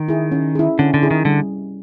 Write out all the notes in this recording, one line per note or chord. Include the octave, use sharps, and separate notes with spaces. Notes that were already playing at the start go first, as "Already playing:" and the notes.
Already playing: D#3
E4 G#4
C#4
E4 G#4
D3 C#4
D3
E4 G#4
D#3
D3 G3